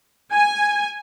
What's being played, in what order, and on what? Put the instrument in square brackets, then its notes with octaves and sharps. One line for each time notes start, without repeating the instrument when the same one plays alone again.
[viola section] G#5